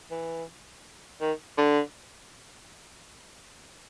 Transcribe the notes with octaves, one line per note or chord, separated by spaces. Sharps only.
E3
D#3
D3